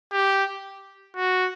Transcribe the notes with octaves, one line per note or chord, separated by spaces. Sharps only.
G4
F#4